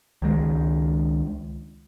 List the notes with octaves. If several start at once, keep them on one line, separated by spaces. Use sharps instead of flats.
C#2 D#3 G#3